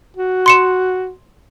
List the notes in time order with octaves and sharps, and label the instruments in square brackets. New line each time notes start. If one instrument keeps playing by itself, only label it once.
[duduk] F#4
[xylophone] C6 C#7 E7